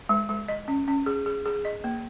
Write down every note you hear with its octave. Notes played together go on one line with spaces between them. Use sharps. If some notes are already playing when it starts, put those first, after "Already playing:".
G#3
G#3
D#5
C#4
C#4
G#4
G#4
G#4
D#5
A#3